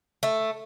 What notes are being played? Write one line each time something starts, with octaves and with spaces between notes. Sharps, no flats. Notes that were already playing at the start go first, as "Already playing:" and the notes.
A3